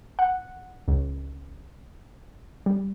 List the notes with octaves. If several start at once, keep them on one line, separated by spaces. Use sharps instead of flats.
F#5
C#2
G3